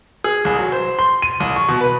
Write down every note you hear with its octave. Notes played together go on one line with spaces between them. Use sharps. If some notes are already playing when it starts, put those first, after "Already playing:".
G#4
C2
F#3
C5
C6
D#7
C2
C#6
B2
B4